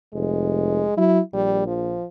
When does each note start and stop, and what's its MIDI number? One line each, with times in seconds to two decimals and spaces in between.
0.13 0.84 29
0.13 0.96 56
0.97 1.20 54
0.97 1.20 64
1.34 1.97 34
1.34 1.66 55
1.67 2.05 53